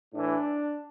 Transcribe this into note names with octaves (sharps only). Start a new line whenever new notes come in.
A2 E3 D4